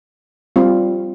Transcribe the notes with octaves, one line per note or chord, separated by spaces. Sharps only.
G3 C4 F4